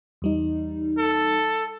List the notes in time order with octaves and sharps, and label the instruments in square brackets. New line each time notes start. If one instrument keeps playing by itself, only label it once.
[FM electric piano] E2 G3 D#4
[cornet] A4